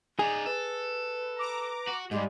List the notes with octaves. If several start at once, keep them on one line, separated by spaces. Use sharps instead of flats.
D#4 G#4 D5
A4 B4
A#5 D6
F#4
G#2 G3 G#3 G4